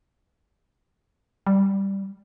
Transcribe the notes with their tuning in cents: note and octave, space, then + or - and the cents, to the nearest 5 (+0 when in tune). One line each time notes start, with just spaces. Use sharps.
G3 +0